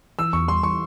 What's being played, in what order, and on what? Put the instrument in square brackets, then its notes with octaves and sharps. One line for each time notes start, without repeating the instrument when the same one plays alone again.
[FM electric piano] E3 [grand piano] E6
[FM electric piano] E2 [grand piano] C#6
[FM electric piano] G3 [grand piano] C6
[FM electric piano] E3 [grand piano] C#6